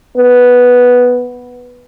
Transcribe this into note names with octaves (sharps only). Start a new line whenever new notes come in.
B3